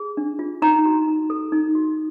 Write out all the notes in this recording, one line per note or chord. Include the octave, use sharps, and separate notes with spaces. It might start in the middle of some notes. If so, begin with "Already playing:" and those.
Already playing: G#4
D4
F4
D#4 A#5
F#4
D#4
A4
D#4
F#4